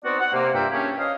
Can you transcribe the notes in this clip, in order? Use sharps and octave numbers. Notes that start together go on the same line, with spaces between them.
B3 C4 D#4 F#4 D5
F#5
C3 A#3
G2 A#3 F4 E5 G5
A#3 C#4 D4 G4 G#4
C#4 D#5 F5